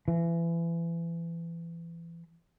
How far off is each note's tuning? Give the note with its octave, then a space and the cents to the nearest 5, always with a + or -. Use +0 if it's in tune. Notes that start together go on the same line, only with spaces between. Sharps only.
E3 +30